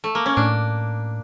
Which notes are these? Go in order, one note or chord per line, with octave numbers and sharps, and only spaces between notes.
A3
A#3
C#4
A2 D4